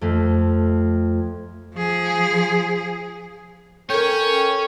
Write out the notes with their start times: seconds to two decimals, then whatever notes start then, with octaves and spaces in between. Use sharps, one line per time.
0.01 F2 A3
1.74 F3 G#4
3.90 C#4 A4 A#4 C#5 G5